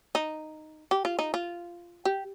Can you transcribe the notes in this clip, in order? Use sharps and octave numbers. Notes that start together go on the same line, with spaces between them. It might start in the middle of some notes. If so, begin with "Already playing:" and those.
D#4
G4
F4
D#4
F4
G4